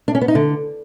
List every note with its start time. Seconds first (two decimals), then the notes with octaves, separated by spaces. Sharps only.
0.08 D4
0.15 C#4
0.21 B3
0.28 D#4
0.35 D3